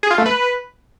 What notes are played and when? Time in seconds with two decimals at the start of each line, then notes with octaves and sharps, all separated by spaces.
0.03 G#4
0.11 F4
0.18 A3
0.26 B4